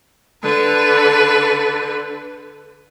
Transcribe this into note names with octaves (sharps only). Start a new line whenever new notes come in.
D3 B4